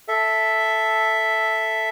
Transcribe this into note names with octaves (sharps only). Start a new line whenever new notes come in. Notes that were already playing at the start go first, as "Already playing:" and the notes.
A4 E5